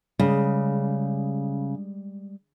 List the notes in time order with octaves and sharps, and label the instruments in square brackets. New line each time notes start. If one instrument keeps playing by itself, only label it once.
[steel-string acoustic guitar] C#3 [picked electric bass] G3 G#3